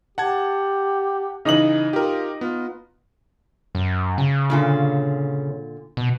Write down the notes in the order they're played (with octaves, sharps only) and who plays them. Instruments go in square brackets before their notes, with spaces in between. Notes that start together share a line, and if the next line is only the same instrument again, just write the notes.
[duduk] G4 [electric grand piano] F#5 A5 G#6
[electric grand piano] C#3 E3 [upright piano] D#4 D#5 F#7
[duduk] F4 [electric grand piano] G4 A#4
[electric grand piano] B3 [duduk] F4
[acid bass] F#2
C#3
[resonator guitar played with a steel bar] A#2 D3 F4
[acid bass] B2